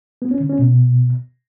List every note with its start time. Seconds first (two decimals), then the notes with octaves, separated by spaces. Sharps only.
0.22 B3
0.31 C#4
0.40 D3
0.50 C#4
0.59 B2